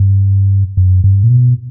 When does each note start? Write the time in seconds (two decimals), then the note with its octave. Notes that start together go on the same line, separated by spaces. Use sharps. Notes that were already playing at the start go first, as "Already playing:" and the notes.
Already playing: G2
0.77 F#2
1.04 G2
1.23 A#2
1.30 B2